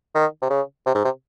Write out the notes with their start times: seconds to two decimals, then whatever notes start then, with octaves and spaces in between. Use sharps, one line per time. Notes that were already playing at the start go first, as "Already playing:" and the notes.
0.15 D#3
0.42 C3
0.50 C#3
0.86 C3
0.95 G#2
1.05 C3